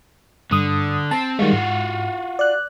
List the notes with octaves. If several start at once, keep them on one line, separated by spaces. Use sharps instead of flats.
G2 D3 D#6
C4 A5
D#3 G3 G#3 F4 F#4
G#2
D5 F#6